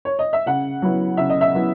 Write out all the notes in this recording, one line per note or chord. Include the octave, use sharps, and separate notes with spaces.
C#5
D#5
E5
C#3 F#5
F#3 B3 E4
C#3 E5
D#5
E5
F#3 B3 E4